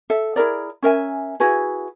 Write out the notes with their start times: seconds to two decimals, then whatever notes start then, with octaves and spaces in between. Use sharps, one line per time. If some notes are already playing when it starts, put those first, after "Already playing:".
0.10 A4 E5
0.36 E4 G#4 A#4 D5
0.83 C#4 A#4 E5 G#5
1.40 E4 F#4 G#4 B4